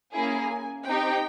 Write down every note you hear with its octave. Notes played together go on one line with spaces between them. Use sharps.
A#3 C#4 E4 G#4 G#5
C4 D#4 G4 G5